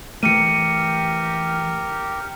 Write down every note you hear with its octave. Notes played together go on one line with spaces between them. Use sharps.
E3 A3 G4 A#4 C#7 D#7